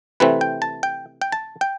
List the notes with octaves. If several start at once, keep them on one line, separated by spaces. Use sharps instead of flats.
C3 E3 A3 C4 B4
G5
A5
G5
G5
A5
G5